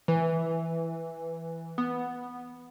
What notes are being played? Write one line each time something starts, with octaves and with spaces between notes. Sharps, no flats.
E3
B3